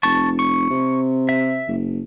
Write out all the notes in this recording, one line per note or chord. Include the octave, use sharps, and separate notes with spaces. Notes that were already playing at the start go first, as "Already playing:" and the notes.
F1 A5 C#6
C#6
C3
E5
F#1